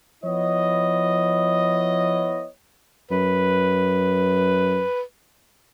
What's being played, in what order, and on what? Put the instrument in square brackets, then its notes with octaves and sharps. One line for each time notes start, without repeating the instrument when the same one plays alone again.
[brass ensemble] F3 B3 E4 C#5 D#5
[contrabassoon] F#2 [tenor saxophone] B4